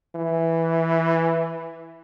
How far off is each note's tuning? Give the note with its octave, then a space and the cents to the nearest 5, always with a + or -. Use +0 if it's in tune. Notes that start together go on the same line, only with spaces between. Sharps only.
E3 +0